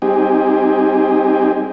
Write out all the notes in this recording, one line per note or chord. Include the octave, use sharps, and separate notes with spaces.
G3 C4 D#4 G4 G#4